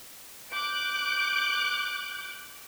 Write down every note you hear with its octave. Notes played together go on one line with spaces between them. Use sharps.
D6 F#6 G6 D7